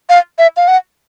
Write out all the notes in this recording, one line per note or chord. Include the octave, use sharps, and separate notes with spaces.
F5
E5
F5
F#5